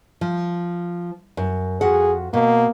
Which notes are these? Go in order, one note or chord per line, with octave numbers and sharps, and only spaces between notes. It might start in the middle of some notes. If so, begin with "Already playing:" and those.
F3
F#2
F2 F#4 G#4 F#5
B2 A#3